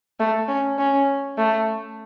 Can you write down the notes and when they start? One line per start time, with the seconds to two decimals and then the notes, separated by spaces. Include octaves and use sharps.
0.20 A3
0.48 C#4
0.78 C#4
1.37 A3